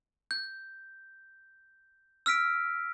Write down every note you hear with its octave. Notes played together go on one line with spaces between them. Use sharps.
G6
E6 F6 B6 D7